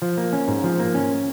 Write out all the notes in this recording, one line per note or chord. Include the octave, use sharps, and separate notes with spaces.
F3
A#3
C#4
G#2
F3
A#3
C#4